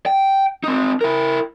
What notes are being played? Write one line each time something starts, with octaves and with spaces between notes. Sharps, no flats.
G5
C4 D#4
E4 A#4